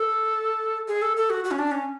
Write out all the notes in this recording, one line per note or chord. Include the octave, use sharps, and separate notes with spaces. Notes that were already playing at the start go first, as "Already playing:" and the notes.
Already playing: A4
G#4
A4
A4
F#4
F#4
C#4
D4
C#4